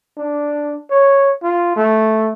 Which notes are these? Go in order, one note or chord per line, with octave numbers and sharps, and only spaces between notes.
D4
C#5
F4
A3